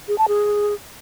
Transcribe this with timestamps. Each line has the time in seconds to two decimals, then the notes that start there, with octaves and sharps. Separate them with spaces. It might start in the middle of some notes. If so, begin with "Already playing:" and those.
0.08 G#4
0.18 A5
0.28 G#4